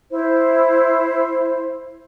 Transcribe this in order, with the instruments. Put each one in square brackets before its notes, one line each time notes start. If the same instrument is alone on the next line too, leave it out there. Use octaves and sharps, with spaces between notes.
[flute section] E4 C5